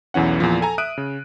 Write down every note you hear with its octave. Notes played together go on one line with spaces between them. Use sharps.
B1 E2 E3 C#4 F#5
E2 A#2 F3
A4 G#5 A#5
E5 D#6 F#6 D7 D#7
C#3